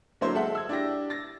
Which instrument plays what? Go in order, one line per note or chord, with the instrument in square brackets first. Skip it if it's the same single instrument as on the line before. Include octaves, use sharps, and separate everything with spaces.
[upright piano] D3 F#3 A#3 E4 C5 C#5
G#3 A4 E5 F#5
E6 G#6
D4 E4 G4 A#6
A6 A#6